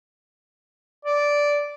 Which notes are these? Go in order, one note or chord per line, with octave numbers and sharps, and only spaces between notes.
D5